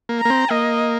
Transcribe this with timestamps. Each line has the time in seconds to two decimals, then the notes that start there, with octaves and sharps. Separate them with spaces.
0.09 A#3
0.20 A#5
0.25 A#3
0.30 C4
0.51 A#3 D#5